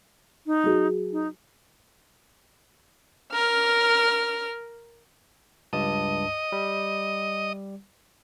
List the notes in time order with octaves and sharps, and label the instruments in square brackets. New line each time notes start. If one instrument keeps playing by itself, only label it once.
[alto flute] D#4
[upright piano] F#3 G#4
[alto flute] D#4
[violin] A#4 F6
[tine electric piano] C#2 G2 A5 [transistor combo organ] D#5
[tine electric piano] G3